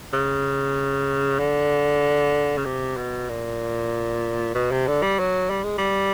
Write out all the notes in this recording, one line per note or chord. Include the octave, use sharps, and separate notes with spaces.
C#3
D3
C#3
C3
B2
A#2
B2
C3
D3
G3
F#3
G3
G#3
G3